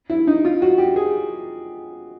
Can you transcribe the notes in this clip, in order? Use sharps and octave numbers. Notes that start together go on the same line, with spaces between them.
E4
D#4
F4
F#4
G4
G#4